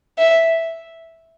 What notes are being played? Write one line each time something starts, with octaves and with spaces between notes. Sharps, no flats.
E5